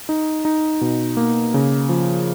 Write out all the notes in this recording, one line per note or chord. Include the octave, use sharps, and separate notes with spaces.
D#4
D#4
B2
A#3
C#3
F3